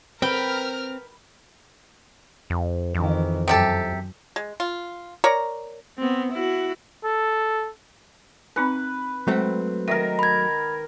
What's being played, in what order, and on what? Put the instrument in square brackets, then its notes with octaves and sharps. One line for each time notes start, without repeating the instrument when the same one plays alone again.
[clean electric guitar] C4 [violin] A#4 F6 [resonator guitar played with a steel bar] B4 [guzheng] G5
[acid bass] F2
[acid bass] F2 [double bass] D#3 E3
[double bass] F#2 [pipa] C3 G4 A4
[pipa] G#3
F4
A#4 C#5 D5 A#5
[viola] B3 C4
E4 F#4
[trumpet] A4
[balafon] C4 D#4 G#5 [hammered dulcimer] B4
[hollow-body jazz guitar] F#3 A3 C4 [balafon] G#3 C5
[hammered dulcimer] D#3 A#4 [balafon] E5
[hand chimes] B5 G#6